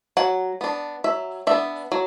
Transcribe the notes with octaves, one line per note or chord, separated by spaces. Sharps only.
F#3 F#5
B3 D4
F#3 E5
B3 D4 E5
F#3